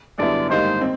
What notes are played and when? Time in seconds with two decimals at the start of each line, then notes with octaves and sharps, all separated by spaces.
0.18 F#2 D3 G3 B3 E4 D5
0.50 G#2 D#3 G3 A#3 C5
0.81 C4